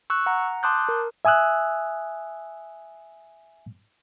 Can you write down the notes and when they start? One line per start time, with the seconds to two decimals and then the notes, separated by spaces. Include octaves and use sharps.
0.10 C#6 E6 F#6
0.26 F#5 A#5
0.63 A5 C6 D6 D#6 F#6 G6
0.89 A#4
1.25 E5 G#5 D#6 E6 F#6